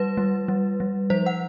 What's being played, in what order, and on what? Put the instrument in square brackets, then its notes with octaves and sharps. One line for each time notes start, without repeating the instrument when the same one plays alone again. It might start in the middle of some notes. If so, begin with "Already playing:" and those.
Already playing: [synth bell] G3 B4
G3
G3
G3
F3 C5
F#5